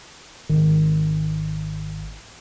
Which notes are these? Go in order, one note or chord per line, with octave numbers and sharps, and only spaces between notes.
G#1 D#3